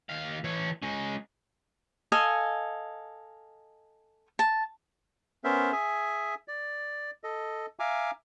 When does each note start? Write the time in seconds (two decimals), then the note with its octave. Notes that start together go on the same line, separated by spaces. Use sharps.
0.09 D#2 F5
0.44 E3 C#5
0.82 G#3 C#4
2.12 A4 D#5 F5 G#5
4.39 A5
5.44 B3 C#4 A#4 C5 E5
5.72 G#4 E5 G#5
6.48 D5
7.24 A4 D#5
7.79 E5 F5 G#5 A#5 D6